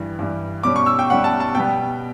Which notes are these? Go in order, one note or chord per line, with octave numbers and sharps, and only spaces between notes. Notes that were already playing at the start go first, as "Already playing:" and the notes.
Already playing: G2 E3 G3
G2 E3 G3
B2 G3 C#4 D6
C#6
E6
G5
B2 G3 C#4 F#5
A5
A5
B2 G3 B3 G5